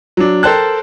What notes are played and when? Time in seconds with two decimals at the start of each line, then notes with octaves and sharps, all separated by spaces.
0.17 F#3 D4
0.43 A4 A#4 C5 G5 A5 F#6